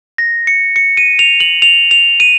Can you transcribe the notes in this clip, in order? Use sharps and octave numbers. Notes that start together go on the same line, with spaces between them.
A#6
C#7
C#7
D#7
F7
F#7
F7
F7
D#7